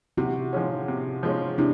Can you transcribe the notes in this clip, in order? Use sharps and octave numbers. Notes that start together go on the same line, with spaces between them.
C3 E4 F#4
F3 G#3 C#4
C3
F3 G#3 C#4
C3 D4 E4